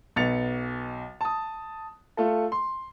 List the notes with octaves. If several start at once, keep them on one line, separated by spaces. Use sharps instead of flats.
B1 B3 A6 C#7 F7
A5 D#6
A3 F4 A4
C6